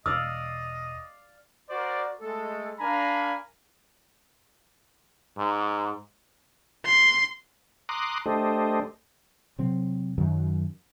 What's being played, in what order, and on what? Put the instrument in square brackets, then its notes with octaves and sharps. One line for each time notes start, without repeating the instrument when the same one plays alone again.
[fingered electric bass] E1 [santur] D5 F5 [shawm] D#5 [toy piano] D#6 E6
[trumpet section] F#4 A#4 C5 D5
G#3 A3 A4
D4 A#4 F5 G#5 A#5 B5
[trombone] G#2
[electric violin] C6
[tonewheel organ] A#5 C6 D6 D#6 F#6
A3 D4 G4 A4 C5 D#5
[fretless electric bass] C3 F#3 C4
F#2 D#3 F#3